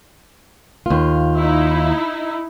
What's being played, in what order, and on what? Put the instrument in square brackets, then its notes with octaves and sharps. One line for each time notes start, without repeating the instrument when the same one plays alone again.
[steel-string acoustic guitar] D#2 F4
[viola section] D#4 E4